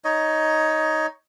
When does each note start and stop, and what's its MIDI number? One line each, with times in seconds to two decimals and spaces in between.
0.04 1.07 63
0.04 1.07 73
0.04 1.07 75